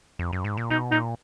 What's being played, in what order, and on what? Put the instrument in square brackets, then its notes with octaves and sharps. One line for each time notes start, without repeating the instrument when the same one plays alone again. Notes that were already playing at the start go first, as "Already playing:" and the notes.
[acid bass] F2
F#2
G#2
A#2
[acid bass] B2 [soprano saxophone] D#4
[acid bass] A#2 [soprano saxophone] D#4